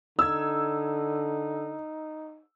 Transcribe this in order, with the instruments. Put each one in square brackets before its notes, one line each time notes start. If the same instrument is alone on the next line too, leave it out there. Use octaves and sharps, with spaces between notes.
[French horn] D3 [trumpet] D#4 [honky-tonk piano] E6 G#6